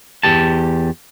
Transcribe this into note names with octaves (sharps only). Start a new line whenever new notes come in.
E2 G4 A5